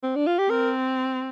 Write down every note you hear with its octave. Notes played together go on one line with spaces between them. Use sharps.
C4
D4
F4
G4
C4 A#4